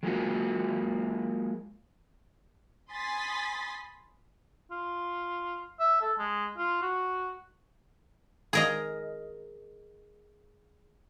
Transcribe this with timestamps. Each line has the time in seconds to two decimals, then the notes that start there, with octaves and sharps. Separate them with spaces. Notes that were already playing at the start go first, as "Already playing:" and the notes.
0.03 F#3 G#3 A#3 F4 F#4 G#4
2.92 G#5 B5 C6 D#6 A6 B6
4.71 F4
5.80 E5
6.01 A4
6.19 G#3
6.58 F4
6.82 F#4
8.53 G#4 A#4 D#5